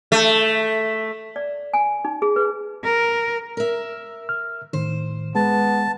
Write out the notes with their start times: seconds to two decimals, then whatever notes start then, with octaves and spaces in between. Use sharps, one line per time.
0.12 A3
1.36 D5
1.73 G#5
2.05 D#4
2.22 G#4
2.36 B4
2.84 A#4
3.57 A#4 E5
4.29 F6
4.73 A2 D#3 C5
5.35 G#3 B3 A5